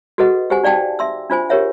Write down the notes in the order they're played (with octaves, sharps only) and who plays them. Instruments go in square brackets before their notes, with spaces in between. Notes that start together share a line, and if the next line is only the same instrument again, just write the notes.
[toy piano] F#4 G#4 A4 B4 D#5 F#5
G4 G#4 C5 F#5 G#5
D#4 D5 F5 G5 A5
E5 C6 E6
D4 F4 C5 G#5
G4 G#4 A#4 C#5 E5 F#5